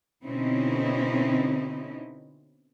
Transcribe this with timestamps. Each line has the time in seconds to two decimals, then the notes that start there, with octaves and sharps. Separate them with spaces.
0.25 B2 D3 C4 C#4 D#4 E4